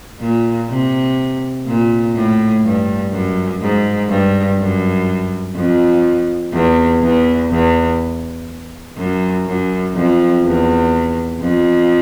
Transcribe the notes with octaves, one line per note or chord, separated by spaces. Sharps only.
A#2
C3
A#2
A2
G2
F#2
G#2
G2
F#2
F2
E2
E2
E2
F#2
F#2
F2
E2
F2